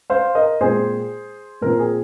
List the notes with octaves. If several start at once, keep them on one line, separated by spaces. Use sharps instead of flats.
C5 F5
A#4 D#5
A#2 G#3 C4 G#4 C5
A#2 F3 C4 A#4
G#4